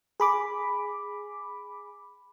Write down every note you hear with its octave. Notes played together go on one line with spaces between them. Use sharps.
G#4 B5 D6